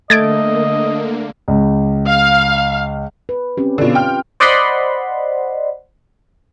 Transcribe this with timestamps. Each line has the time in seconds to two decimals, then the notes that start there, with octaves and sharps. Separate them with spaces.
0.10 D3 A3 A#3 D#5 G#6 A6 D7
1.48 C#2
2.06 F5
3.29 B4
3.57 C4 C#4 G4
3.78 B2 D3 C4 F4
3.95 G5 F6
4.40 C5 D5 D#5 F#5 B5 C6